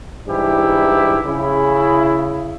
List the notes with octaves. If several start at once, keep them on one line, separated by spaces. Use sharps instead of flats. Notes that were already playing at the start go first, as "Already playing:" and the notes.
G#2 E3 G3 D4 E4 G4
C#3 E4